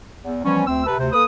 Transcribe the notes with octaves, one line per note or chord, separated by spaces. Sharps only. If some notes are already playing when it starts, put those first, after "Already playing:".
E2
E3 F3 G3 B3 C#4
D2 C4 E6
C3 A4 B4
D2 C3 C5
A#3 A4 B4 D#6